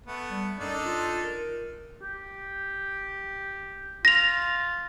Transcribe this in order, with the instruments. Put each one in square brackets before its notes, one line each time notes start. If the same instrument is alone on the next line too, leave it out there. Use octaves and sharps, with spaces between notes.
[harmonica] A3 B3
[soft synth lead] G3
[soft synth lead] F#2 [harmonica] D4 D#4 A4
[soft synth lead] F4
A#4
[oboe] G4
[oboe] F4 [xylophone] A#6 F7